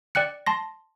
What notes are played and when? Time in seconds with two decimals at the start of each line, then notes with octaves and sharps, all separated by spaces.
0.15 D5 G5 F#6 C#7
0.47 A5 C6 A#6